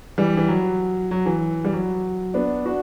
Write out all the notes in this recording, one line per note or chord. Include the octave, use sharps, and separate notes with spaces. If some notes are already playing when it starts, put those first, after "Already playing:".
E3 G3
E3
F#3
F#3
E3
G3
F#3
B3 D4
D4 F#4